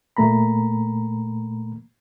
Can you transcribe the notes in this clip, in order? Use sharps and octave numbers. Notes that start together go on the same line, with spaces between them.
A#2 A3 A#3 A#5 B5